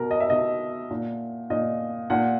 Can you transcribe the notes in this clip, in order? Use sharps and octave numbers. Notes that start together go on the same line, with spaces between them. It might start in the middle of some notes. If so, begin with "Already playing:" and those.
Already playing: B2 A#4
D#5
E5
B2 D#5
A#2
A#2 D#5
A#2 F#5